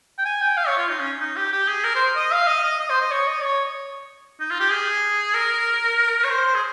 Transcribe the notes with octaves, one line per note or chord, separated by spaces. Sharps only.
G5
G#5
G5
F5
C#5
F4
D#4
C#4
D#4
G4
G4
G#4
A#4
C5
D#5
F5
D#5
D#5
D#5
C5
D#5
C#5
D#5
C#5
D#4
F4
G4
G#4
A#4
C#5
C5
G#4